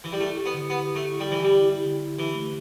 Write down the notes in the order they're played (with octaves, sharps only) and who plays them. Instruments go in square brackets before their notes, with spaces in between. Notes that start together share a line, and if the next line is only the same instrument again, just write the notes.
[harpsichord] E3
G3
[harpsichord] A3 [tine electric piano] E4
[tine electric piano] G4
[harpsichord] B3
[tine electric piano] D3
[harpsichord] B3 [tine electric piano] G4
[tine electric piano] G4
[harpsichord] A3
[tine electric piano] E4
[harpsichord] G3 [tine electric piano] G4
[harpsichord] E3
[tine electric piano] G4
[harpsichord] G3
[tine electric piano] E4
E4
D3
D3
[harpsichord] E3 [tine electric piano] G4
[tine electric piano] A3